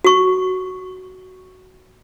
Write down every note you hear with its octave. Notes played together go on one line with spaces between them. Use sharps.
F#4 C#6